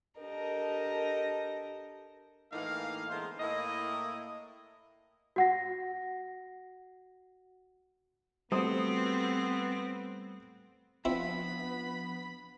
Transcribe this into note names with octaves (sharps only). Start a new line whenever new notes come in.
D4 G4 A4 A#4 D#5
A2 E3 A#3 D#4 F5
D3 E3 G#3 B3 A#4 C5
A2 A#3 E4 D#5
F#4 F#5 A#6
G3 A3 B3 C4 F#4 C5 D#6
F3 B3 C4 D4 E4 F4 B5